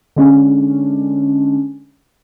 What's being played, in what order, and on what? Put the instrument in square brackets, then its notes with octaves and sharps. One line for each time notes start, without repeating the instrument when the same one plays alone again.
[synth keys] D3 G#3 C#4 D4